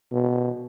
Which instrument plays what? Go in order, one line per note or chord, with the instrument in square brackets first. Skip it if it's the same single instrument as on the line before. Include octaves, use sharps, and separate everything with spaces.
[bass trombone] B2